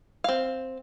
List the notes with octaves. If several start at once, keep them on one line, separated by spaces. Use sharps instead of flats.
C4 F5